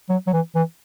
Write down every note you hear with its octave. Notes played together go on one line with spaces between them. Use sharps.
F#3
F#3
E3
E3